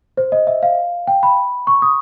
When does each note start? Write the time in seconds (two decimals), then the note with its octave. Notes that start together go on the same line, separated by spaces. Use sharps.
0.17 C5
0.32 D#5
0.47 E5
0.63 F5
1.08 G5
1.23 B5
1.67 C#6
1.82 D#6